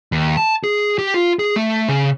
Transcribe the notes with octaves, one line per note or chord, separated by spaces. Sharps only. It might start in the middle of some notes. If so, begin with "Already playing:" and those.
D#2
A5
G#4
G4
F4
G#4
A3
C#3